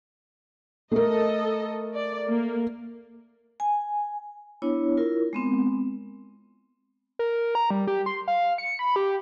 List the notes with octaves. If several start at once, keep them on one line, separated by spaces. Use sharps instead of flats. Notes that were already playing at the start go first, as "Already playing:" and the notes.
A3 A4 A#4 D#5
D5
A#3
G#5
B3 D4 E4 C#5
E4 F4 A#4
G#3 B3 C4
A#4
A#5
G3
G4
C6
F5
C#7
B5
G4